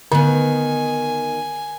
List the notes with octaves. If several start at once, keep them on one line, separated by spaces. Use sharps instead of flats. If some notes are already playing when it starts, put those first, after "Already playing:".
D3 D#3 B3 G#5